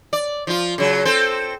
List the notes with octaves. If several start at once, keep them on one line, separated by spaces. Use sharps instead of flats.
D5
F3 F4
C#3 F#3
C4 A4 C5